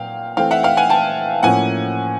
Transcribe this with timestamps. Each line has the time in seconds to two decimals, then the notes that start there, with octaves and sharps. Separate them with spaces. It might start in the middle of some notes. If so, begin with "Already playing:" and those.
Already playing: A#2 F#3 F5 G5
0.37 E3 A3 C4 F5 G5
0.51 E5 F#5
0.63 F5 G5
0.77 F#5 G#5
0.90 G5 A5
1.43 A2 F3 A#3 C#4 F#5 G#5